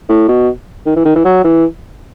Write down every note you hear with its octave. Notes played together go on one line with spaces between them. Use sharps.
A2
B2
D#3
E3
D#3
E3
F#3
E3